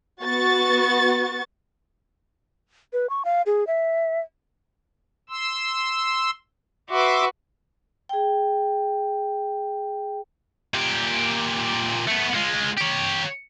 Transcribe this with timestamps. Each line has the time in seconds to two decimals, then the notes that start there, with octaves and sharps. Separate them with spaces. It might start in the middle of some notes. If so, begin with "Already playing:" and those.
0.23 B3 F#4 C#6 A6
2.93 B4
3.10 C#6
3.25 F5
3.46 G#4
3.67 E5
5.30 C6 E6
6.89 F#4 B4 E5 C6 D6
8.09 G#4 G5
10.74 A#2 G4
12.08 A3 B3
12.35 G#3 F4
12.78 G4 C#5